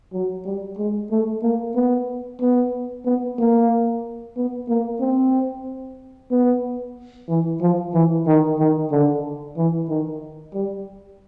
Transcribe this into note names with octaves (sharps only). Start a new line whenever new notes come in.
F#3
G3
G#3
A3
A#3
B3
B3
B3
A#3
B3
A#3
C4
B3
E3
F3
E3
D#3
D#3
D3
E3
D#3
G3